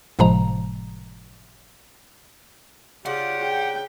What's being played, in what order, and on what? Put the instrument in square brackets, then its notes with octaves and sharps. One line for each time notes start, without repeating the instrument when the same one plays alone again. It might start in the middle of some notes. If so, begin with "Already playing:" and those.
[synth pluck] G1 A2 C3 F3 G#3 A#5
[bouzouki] C#3 D4 [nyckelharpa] F4 [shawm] G4 [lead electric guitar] F#5
[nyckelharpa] G5